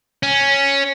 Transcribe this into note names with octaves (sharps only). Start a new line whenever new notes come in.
C#4